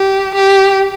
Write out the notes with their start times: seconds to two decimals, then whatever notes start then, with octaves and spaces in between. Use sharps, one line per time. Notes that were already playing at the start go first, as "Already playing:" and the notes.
Already playing: G4
0.35 G4